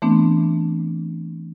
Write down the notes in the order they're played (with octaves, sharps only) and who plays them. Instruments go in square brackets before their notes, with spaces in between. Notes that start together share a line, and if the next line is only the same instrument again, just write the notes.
[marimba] E3 A3 B3 C4 D4